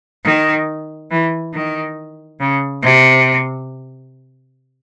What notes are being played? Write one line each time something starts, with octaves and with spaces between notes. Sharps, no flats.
D#3
E3
D#3
C#3
C3